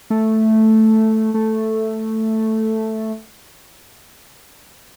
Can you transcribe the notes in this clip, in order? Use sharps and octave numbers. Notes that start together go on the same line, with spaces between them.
A3
A3